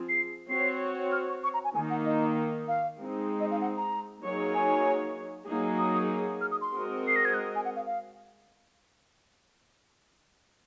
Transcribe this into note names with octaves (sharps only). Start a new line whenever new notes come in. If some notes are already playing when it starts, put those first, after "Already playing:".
Already playing: F3 C4 F4 G#4
C7
C4 F#4 C#5 C7
F6
C#6
C#6
A#5
G#5
D#3 A#3 D#4 G#5
F#5
D#5
F5
G#3 C4 D#4
D#5
F5
F#5
A#5
F#3 A#3 D#4 G#4 C#5
G#5
F#3 A#3 D#4 G#4
D#6
F6
D#6
C6
G#3 C4 F#4 A#4 D#5
C7
A#6
G#6
F#6
G#5
F#5
F5
F5